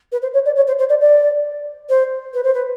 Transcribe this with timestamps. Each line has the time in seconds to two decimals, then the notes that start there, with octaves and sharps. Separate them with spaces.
0.12 B4
0.22 C5
0.34 C#5
0.45 D5
0.56 C#5
0.67 C5
0.79 C5
0.89 D5
1.01 D5
1.89 C5
2.34 B4
2.43 C5
2.54 B4